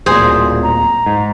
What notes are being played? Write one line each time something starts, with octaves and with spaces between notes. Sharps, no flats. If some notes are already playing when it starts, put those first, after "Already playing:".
D1 A#2 G#4 C5
A#5
G#2